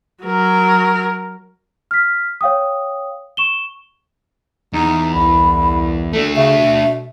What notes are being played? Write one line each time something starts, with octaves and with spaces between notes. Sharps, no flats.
F#3 A#4
F6 B6
C#5 F5 G5 D#6
C#6 E7 G7
E2 D#4
C2 B5
A3 D4 A4
C#3 E5
B2